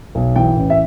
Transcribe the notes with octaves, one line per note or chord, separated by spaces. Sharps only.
B1
E3 G5
A1
E5